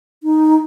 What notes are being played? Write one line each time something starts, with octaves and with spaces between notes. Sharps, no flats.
D#4